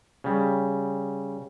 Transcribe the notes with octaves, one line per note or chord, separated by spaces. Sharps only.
C#3 G3